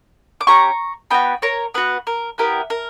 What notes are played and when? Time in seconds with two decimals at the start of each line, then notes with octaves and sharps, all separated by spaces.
0.41 D6
0.47 C#4 G4 A#5 C#6
1.11 B3 F#4 G5 B5
1.42 A#4 C#5
1.74 B3 F#4 B4
2.07 A#4
2.38 B3 E4 G4 A#4
2.70 A#4